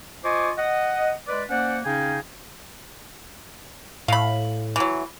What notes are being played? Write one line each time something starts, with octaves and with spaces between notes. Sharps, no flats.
F4 C5 D#5 G#5 C#6 D6
D#5 F#5
G#3 B4 D5
A#3 C#4 C5 D5 F#5
C#3 C#4 D#4 F5 G5 G#5
A2 F5 B5
E3 F#3